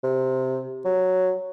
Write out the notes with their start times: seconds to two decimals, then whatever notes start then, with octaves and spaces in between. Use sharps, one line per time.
0.04 C3
0.85 F#3